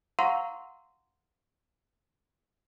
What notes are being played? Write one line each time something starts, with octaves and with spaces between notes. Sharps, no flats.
F5 F#5 A#5 C6 C#6 E6